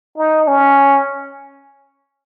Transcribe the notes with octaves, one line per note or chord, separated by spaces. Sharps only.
D#4
C#4